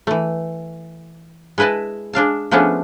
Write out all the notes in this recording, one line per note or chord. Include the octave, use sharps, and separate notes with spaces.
E3 A3
G#3 E4 B4 D#5 A5
G#3 D4 F5 A5
F3 G#3 A3 B3 C#4 D4